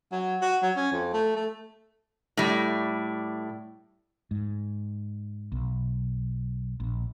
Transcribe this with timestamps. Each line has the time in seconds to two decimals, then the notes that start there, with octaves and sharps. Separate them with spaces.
0.12 F#3
0.42 F#4
0.62 F#3
0.76 C#4
0.92 F2
1.13 A3
1.36 A3
2.37 A2 G3
4.31 G#2
5.52 B1
6.80 A#1